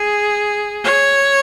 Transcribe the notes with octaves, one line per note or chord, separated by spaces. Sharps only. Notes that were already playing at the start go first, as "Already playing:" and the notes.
Already playing: G#4
C#5